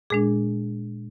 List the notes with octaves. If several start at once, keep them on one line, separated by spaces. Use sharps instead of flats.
A#2 G#3 D4 G#4